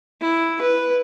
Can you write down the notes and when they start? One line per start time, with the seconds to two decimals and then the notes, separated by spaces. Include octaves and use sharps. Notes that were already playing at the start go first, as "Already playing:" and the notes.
0.21 E4
0.61 B4